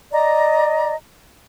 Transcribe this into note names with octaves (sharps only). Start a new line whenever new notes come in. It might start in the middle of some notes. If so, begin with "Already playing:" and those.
D5 D#5 A#5